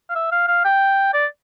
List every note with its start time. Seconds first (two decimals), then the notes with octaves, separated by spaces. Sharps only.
0.10 F5
0.15 E5
0.32 F5
0.48 F5
0.65 G5
1.14 D5